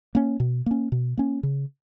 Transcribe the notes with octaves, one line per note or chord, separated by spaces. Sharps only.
A#3 C#4
B2
A#3 C#4
B2
A#3 C#4
C#3